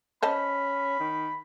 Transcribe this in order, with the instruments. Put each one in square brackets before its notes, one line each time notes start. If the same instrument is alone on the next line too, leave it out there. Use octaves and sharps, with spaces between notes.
[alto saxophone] C#4 [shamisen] C5 D#5 A5 [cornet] B5
[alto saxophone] D#3